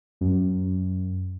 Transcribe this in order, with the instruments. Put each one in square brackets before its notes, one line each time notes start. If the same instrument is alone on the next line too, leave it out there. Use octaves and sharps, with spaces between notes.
[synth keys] F#2